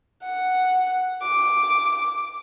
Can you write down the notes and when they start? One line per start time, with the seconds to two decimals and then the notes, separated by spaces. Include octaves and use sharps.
0.23 F#5
1.22 D6